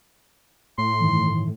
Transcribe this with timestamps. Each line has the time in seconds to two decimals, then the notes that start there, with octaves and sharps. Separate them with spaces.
0.78 A2 C6
1.01 G2 D#3 E3